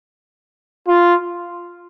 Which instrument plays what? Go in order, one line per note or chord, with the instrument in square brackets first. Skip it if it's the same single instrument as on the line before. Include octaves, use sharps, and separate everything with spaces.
[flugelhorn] F4